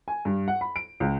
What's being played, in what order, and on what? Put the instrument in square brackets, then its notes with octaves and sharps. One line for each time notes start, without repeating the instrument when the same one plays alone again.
[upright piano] G#5
G2
F#5
B5
D7
C#2